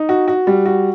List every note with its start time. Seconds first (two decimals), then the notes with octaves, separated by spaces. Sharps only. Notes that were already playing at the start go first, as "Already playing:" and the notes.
Already playing: D#4
0.09 F#4
0.28 F#4
0.47 G3
0.66 F#4